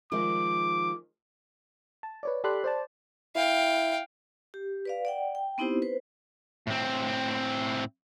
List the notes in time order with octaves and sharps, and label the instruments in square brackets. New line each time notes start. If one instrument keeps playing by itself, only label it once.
[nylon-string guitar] D#3 F3 G#3 [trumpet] D6
[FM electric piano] A5
B4 C#5 D5
G4 A4 D5 B5 C6 F#6
C5 D5 A5
[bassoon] E4 [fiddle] F5 G5
[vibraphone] G4
B4 D5 F5
D5 F#5 G5
G5
B3 C4 D#4 E4 G4 C5
B4 C5
[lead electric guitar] A2 C4